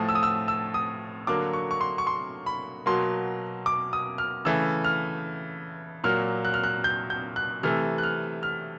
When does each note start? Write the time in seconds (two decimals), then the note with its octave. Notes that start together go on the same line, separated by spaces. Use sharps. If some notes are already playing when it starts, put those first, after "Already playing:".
Already playing: A2 F3 A3 D#6
0.09 E6
0.15 D#6
0.23 E6
0.48 E6
0.74 D#6
1.27 D3 F#3 A#3 D6
1.53 C#6
1.71 C#6
1.81 C6
1.98 C#6
2.07 C6
2.46 B5
2.86 B2 F#3 A#3 C6
3.66 D6
3.93 D#6
4.18 F6
4.45 C#3 E3 A3 E6
4.84 F6
6.04 A#2 F#3 A#3 F6
6.45 F#6
6.54 F6
6.64 F#6
6.84 G6
7.10 G6
7.36 F#6
7.63 C3 E3 A3 F6
7.98 F#6
8.03 F6
8.43 F6